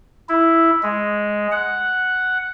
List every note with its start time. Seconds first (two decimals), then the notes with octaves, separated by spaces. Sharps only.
0.29 E4
0.83 G#3
1.52 F#5